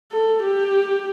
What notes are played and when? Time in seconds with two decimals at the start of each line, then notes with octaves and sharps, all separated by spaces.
0.12 A4
0.43 G4